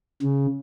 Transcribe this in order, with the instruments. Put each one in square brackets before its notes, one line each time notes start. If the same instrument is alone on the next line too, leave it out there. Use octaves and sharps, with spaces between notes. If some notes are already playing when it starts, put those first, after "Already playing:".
[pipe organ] C#3